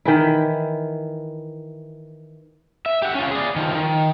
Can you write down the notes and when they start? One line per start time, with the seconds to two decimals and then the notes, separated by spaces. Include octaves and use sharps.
0.05 D#3 E3 E4
2.86 E5
3.02 G4 F#5
3.15 C#4 F4
3.31 G#4 D5
3.56 D#3 F3
3.74 D#3